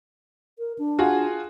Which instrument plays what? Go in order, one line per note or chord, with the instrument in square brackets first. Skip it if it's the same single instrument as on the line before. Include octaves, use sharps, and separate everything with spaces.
[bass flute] A#4
D4
[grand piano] F4 F#4 G#4